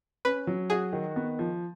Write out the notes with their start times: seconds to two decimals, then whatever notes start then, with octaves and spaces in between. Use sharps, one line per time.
0.25 C#4 B4
0.47 F#3
0.70 F#4 G#4
0.93 D#3
1.16 B3
1.39 F3